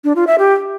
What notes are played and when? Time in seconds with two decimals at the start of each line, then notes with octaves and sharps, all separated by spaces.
0.04 D4
0.16 F4
0.27 E5
0.39 G4